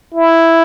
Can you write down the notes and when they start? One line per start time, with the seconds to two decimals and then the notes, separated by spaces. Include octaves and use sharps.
0.14 E4